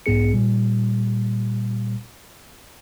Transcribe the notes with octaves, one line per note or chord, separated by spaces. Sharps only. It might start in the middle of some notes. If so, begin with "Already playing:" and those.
B1 G#2 B3 G#4 C#7
A#2 G3